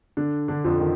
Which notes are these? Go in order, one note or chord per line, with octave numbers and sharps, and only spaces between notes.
D3 D4
D3 D4
F2 F3
D#3